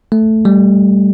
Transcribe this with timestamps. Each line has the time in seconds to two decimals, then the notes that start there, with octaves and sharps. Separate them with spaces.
0.12 A3
0.45 G3